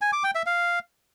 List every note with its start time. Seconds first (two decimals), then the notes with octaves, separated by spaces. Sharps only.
0.01 G#5
0.13 D6
0.24 G5
0.35 E5
0.46 F5